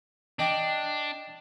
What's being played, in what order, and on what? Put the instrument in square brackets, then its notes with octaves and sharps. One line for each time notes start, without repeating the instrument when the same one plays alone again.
[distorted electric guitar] D4 [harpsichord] D#5 G5 D6